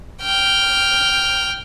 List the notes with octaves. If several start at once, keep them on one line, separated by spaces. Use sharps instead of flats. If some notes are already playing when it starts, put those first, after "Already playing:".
G5 F6